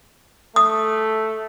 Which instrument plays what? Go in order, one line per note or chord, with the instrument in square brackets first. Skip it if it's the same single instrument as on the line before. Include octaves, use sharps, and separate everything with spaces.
[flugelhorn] A3 [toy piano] D#6